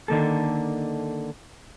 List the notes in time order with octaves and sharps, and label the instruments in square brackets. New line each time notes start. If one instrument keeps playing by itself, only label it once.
[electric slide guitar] D3 D#3 A#3 A4